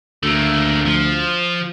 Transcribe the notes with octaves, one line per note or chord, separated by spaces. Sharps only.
D2 A3 A#3
F3